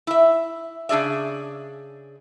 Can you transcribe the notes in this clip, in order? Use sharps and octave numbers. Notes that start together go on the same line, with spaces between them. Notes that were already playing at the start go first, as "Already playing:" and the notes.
E4 E5
C#3 D4 G#4 D5 E5